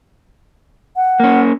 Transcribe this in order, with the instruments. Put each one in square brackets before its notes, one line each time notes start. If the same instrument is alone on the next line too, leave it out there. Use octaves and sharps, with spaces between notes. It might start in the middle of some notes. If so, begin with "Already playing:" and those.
[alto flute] F#5
[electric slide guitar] A#3 C#4